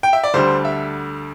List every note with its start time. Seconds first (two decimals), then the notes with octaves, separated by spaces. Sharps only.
0.03 G5
0.13 E5
0.24 D5
0.34 D2 D3 G3 C5
0.65 E5